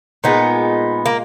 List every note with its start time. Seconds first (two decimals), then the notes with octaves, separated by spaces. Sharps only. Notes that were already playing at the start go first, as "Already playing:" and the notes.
0.24 A#2 G#3 B3 D#4
1.06 A#3